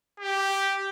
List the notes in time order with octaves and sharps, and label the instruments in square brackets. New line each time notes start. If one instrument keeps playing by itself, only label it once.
[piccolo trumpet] G4